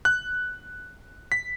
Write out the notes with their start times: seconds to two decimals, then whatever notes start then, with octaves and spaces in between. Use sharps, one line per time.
0.05 F#6
1.32 B6